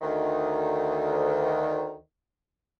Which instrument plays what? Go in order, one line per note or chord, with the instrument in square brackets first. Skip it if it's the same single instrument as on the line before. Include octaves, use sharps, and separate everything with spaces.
[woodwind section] D2 D#3